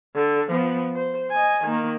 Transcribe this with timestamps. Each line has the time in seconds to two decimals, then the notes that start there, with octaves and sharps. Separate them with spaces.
0.15 D3
0.50 F3 B3
0.95 C5
1.31 D#5 G#5
1.64 D#3 A#3